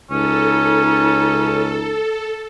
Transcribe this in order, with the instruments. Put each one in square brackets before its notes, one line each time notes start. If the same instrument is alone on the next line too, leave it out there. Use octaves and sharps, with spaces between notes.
[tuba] C#2 [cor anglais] C#4 [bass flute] D#4 [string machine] A4